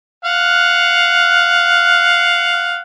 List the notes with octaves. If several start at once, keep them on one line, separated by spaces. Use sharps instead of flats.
F5 F#5